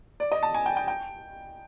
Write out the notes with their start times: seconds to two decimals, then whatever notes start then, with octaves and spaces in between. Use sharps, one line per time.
0.20 D5
0.32 D#5
0.43 A5
0.54 G#5
0.66 G5
0.77 G5
0.88 G5